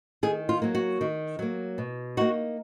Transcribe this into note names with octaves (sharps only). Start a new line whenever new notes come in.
D#3 G#4
F4
F#3 A#3
F#4
D#3
F#3 A#3
B2
A#3 D#4 F#4